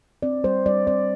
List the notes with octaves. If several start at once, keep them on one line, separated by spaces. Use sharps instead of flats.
C4 D5
G3 C5
G3 D5
C4 D5